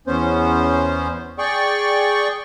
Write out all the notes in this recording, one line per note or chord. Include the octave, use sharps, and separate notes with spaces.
E2 B3 C#4 C5
G#4 D5 G5 C#6